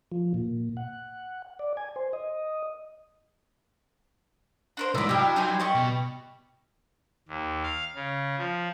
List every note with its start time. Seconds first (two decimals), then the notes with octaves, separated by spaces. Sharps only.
0.12 F3
0.34 A#2
0.77 F#5
1.59 D5
1.77 G#5
1.96 C5
2.13 D#5
4.77 D4 A#4 C5
4.95 C2 G#2 E4 D5 D#5 B5 D6
5.09 F#3 G3 D4 E4 G4
5.36 D#4 F4 G#5
5.60 G4 D5 D#5 C#6
5.75 B2
7.28 D#2
7.63 F5
7.95 C#3
8.38 F3